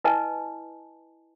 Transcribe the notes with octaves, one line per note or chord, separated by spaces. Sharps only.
E4 B4 D#5 G#5 A5